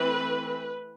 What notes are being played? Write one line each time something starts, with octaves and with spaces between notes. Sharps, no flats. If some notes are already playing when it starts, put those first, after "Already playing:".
Already playing: E3 A3 C4 B4